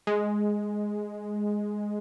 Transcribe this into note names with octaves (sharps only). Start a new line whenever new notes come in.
G#3